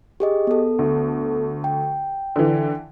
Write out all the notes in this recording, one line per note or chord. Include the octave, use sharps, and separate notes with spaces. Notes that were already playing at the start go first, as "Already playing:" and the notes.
G4 G#4 D#5
B3 A4
D2
G5
D3 E3